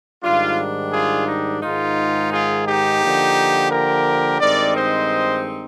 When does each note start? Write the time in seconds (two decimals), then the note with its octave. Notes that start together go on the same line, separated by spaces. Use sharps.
0.23 G#2 D#3 G3 D4 F4
0.93 F4 G#4
1.27 D#4
1.62 G#2 D#3 G#3 D#4 F4
2.32 F4 G#4
2.66 D#4 G4
3.02 D3 F3 A#3
3.71 G4 A#4
4.40 G2 D#3 G#3 C4 D#4 A#4 D5
4.76 C5 D#5